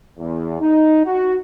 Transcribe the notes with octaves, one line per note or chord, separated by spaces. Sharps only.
E2
D#4
F#4